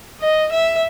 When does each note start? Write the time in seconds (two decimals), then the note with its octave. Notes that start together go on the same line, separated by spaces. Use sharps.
0.21 D#5
0.52 E5